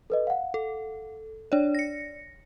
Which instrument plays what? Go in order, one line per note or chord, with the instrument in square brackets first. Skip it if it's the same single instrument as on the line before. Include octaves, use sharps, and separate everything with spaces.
[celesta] A4 B4 D#5
F5 F#5
[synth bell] A4
[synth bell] D4 C#5 [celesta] D5
[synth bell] A#6 C#7